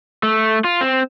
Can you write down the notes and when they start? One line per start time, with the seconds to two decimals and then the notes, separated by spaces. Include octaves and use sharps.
0.23 A3
0.64 F4
0.81 C4